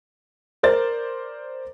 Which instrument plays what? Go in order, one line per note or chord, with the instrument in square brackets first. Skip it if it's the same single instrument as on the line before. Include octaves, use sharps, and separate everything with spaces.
[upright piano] A#4 C5 D5 A6